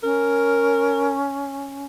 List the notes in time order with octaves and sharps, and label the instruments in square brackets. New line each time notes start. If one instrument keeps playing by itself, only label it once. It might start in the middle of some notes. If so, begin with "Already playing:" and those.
[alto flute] C#4 [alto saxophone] A#4